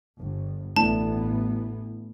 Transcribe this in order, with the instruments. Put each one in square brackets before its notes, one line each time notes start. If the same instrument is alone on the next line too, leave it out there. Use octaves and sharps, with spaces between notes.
[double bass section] G1
[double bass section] A1 E3 B3 [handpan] A3 D4 E4 [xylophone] A5